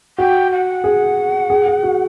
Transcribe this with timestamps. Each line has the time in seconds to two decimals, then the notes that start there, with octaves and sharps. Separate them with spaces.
0.18 F#4 G5
0.51 F#5
0.84 G#4
1.50 G#4
1.66 G#4
1.83 F#4